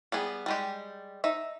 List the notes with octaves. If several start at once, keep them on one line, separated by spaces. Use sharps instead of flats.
G3 B3 G#4
G3 G#3 G4
D#4 E5